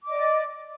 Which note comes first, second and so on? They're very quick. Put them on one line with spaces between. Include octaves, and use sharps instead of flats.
D6 D#5 D5